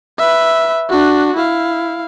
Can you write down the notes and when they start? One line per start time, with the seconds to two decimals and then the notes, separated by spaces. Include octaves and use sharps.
0.18 B4 E5
0.90 D4 F#4
1.36 E4 F5